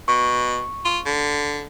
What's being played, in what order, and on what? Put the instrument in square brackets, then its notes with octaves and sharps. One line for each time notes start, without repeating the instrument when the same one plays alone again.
[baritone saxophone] B2 [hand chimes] C#6
[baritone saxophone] F4
D3